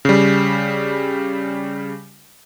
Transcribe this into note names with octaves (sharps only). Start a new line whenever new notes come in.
C#3 G3